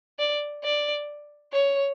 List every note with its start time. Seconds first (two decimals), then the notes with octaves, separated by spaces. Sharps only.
0.19 D5
0.64 D5
1.52 C#5